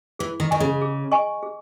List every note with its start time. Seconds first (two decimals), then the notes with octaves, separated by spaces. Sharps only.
0.19 E3 G#4
0.40 D#3
0.51 D#3 D#5 G#5 C#6
0.60 C#3
0.82 G#4
1.12 D#5 G#5 C#6
1.43 G#4